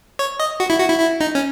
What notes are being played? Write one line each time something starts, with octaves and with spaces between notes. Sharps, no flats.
C#5
D#5
F#4
E4
F#4
E4
E4
D#4
C#4